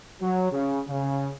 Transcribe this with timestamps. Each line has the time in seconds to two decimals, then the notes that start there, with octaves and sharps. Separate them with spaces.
0.20 F#3
0.52 C#3
0.88 C#3